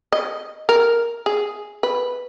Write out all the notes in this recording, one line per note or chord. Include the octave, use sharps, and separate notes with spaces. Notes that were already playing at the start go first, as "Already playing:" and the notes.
D#5
A#4
G#4
B4